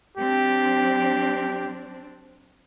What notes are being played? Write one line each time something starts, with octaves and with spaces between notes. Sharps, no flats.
F#3 C4 D4 G4